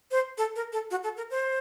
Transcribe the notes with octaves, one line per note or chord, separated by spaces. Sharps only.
C5
A4
A#4
A4
F#4
A4
A#4
C5